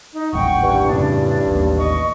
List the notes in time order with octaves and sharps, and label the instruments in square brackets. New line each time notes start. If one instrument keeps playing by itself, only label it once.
[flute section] D#4
[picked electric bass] D#1 A1 [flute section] F#5 G5 C#6
[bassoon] G2
[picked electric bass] F2 A2 C#3 [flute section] D4
[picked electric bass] A1 D#2
[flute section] D#5 C#6